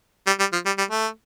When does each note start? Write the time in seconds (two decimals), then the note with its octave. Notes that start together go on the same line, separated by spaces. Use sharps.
0.27 G3
0.39 G3
0.52 F3
0.66 G3
0.78 G3
0.91 A3